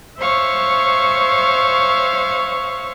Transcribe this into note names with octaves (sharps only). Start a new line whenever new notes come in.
C5 C#5 E5 F5 C#6